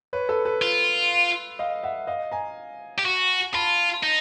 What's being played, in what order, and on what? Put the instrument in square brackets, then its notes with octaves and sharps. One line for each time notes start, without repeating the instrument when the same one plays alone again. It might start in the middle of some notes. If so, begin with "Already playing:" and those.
[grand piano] B4 C#5
A4 B4
A4 B4
[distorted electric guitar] F4
[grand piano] D#5 F5
E5 F#5
D#5 F5
G#5 A#5
[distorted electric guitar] G4
F#4
[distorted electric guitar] F4 [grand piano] A5 B5
[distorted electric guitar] D#4